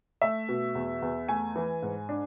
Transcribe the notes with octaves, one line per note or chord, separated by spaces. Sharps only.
A3 E5
B2
E2
E2
A3 G#5
E3
G#2
D4